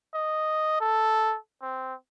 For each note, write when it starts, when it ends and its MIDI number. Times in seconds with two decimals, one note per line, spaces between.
0.14 0.77 75
0.81 1.36 69
1.62 1.94 60